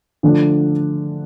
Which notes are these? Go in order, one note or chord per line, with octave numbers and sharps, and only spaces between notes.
D3 F3 A3 D4